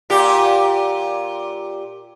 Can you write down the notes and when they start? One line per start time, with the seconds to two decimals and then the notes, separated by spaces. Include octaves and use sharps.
0.10 A#2 G4